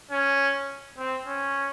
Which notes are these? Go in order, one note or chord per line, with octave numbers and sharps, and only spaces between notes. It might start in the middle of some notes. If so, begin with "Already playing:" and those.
C#4
C4
C#4